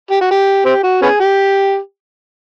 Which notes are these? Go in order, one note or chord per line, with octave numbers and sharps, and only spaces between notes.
G4
F#4
G4
C4 G4
F#4
B3 C#4 G#4
G4